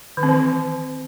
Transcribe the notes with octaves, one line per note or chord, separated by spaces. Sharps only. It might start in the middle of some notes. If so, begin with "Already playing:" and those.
D#3
C4
E3